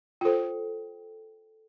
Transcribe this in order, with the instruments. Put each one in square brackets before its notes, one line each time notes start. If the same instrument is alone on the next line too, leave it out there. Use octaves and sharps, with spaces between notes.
[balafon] F4 C5 [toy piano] A4 G5